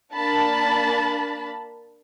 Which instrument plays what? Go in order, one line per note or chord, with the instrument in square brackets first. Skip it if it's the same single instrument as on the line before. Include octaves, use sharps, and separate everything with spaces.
[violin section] A#3 D4 A5 B5